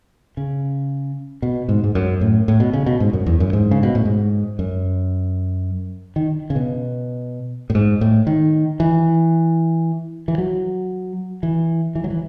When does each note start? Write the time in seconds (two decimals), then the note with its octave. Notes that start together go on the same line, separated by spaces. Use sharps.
0.37 C#3
1.42 B2
1.69 G#2
1.84 G#2
1.95 F#2
2.21 A2
2.48 A2
2.60 B2
2.73 C#3
2.86 B2
3.00 G#2
3.13 F#2
3.26 E2
3.40 F#2
3.53 G#2
3.71 C#3
3.83 B2
3.95 A2
4.05 G#2
4.59 F#2
6.16 D#3
6.50 C#3
6.55 B2
7.70 A2
7.75 G#2
8.01 A2
8.27 D#3
8.80 E3
10.28 E3
10.38 F#3
11.43 E3
11.95 E3
12.04 F#3
12.10 E3